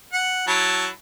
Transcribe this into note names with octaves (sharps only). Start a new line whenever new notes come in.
F#5
F#3 E4 A5